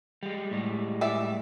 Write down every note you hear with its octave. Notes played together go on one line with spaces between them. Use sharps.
G3 G#3
A2 G3 G#3
E3 D5 E5